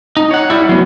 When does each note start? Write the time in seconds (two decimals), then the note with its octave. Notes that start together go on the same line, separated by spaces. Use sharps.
0.17 D#4
0.31 C#5 F#5
0.50 G3 E4
0.69 F#3 B3